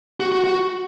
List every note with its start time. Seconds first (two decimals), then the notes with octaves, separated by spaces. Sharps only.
0.20 F#4
0.32 F#4
0.44 F#4